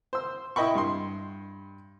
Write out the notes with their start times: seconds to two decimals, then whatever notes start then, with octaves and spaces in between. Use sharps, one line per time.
0.13 C5 E6
0.56 E4 D#5 G5 B5 C#6
0.75 G2 C6